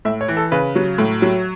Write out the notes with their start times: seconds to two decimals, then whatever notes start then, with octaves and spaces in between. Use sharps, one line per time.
0.05 A2 E5
0.21 C#5
0.28 E3
0.37 A4
0.52 C#3 B4
0.76 F#3
0.98 A2
1.22 F#3